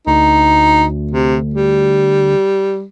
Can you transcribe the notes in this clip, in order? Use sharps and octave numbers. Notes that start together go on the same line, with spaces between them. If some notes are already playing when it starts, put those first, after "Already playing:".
D2 D#4
C3
G3